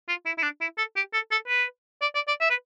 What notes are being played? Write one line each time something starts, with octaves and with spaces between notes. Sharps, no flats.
F4
E4
E4
D4
E4
A4
G4
A4
A4
B4
D5
D5
D5
E5
B4